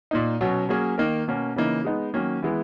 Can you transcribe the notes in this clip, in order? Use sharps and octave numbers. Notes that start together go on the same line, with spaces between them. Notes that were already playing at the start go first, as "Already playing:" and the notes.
A#2 A#3 D#4
B2 F#3 C#4
F#3 A#3 C#4 G#4
D#3 A#3 D#4 A#4
B2 A#3 C#4
C#3 E3 A#3 D#4
G#3 B3 D#4
D#3 F#3 A#3 C#4
E3 G#3 B3 E4